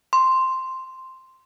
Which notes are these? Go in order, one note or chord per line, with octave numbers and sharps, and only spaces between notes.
C6